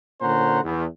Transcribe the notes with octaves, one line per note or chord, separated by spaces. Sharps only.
A#2 D3 C#4 C5 F#5 A#5
E2